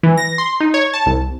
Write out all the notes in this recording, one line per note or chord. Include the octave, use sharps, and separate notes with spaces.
E3
A#6
C6
D#4
C#5
A5
C2